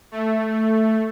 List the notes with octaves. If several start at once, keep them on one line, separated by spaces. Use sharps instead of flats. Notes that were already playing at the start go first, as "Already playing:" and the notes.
A3